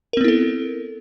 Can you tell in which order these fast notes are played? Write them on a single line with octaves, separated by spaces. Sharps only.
A#4 C4 B3 E4 A4